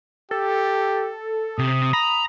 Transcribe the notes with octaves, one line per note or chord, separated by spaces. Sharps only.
G4 A4
C3 D#6
A#5 B5